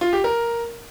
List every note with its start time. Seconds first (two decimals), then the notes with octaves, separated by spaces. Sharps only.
0.01 F4
0.13 G4
0.24 A#4